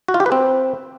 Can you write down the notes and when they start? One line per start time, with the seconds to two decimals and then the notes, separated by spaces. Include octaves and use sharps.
0.08 F#4
0.14 F4
0.20 G4
0.26 B4
0.32 C4